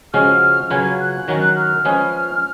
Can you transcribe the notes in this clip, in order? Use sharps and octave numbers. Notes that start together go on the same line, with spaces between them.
C#3 F3 G#3 C#4 F#4 F6
C#3 F#3 C#4 F4 B4 G#6
G#6
F#6
D#3 F#3 C#4 F#4 A#4
F6
F3 G#3 C#4 G#4 B4